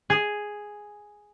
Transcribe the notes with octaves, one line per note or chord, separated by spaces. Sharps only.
G#4